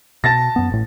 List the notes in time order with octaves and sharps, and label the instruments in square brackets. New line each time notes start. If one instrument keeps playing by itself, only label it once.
[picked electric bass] B2 [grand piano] A5 A6 A#6
[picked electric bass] F#2 B3
A1 A2